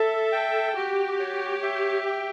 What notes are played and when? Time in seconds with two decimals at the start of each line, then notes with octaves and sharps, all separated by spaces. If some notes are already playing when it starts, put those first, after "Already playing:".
Already playing: A4 E5
0.32 G5
0.76 F#4 G4
1.20 C#5
1.63 E5
2.06 G5